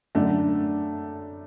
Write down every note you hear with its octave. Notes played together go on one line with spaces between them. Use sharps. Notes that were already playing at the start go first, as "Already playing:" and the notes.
F#2 D3 A3 D4